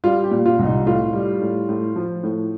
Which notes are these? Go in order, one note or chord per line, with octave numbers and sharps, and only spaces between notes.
G3 F4
G4
A#2
F4
C2
D#4
A2 F4
G3
A2
A2
F3
A2